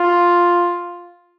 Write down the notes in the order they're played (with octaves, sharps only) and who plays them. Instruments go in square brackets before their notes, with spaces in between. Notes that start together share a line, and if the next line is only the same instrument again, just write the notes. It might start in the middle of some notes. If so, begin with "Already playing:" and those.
Already playing: [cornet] F4